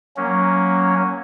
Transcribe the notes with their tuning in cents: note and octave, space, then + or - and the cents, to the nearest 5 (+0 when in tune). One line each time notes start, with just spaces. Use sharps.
F#3 +0 A#3 +0 C#4 +0